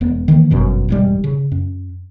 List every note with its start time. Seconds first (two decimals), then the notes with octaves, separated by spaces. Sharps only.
0.01 E1 B3
0.28 D#3 E3 G3 A#3
0.51 G1 F#2 B2
0.89 E1 G#2 G3
1.24 C#3
1.52 F#2